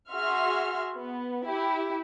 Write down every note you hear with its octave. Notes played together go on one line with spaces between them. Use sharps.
F#4 G#4 E5 C6 F6
B3
E4 G4